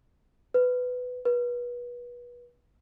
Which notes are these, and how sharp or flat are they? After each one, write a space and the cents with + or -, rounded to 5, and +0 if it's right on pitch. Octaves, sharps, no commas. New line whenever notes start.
B4 +15
B4 -30